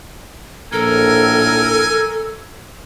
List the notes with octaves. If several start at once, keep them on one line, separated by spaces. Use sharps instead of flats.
A#1 A2 A4 A#4 G#5